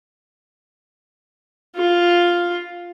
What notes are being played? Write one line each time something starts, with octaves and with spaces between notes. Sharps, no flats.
F4